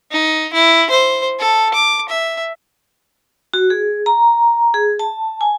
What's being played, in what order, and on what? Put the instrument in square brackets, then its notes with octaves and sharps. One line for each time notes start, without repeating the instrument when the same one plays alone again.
[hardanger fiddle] D#4
E4
C5
A4
D6
E5
[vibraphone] F#4
G#4
A#5
G#4
A5
G#5